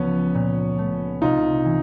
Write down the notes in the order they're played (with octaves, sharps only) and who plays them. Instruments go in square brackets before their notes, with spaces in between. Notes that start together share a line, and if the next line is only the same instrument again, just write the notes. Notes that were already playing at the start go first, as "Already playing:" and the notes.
Already playing: [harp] C#2 F3 [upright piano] B3 C#4
[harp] A#2
A3
[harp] C2 [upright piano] D#4 F4
[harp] E3